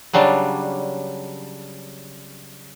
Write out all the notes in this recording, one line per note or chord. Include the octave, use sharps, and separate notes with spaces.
C#3 F#3 G3 D4